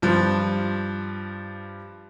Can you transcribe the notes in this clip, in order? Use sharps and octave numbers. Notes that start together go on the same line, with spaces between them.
G2 F3